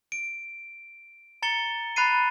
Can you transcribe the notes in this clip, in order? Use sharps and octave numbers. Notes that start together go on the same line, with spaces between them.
D7
A#5 A6 C#7 G7
A#5 B5 F#6 A6 C7 D#7